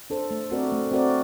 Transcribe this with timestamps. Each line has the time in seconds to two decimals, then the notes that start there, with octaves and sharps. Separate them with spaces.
0.10 D4 A4 C5
0.31 A3
0.51 C4 F#4 A#4 D5
0.72 A3
0.92 C4 F#4 A#4 D5